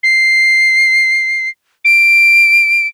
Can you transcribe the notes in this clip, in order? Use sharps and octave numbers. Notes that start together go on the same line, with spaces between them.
C7
D7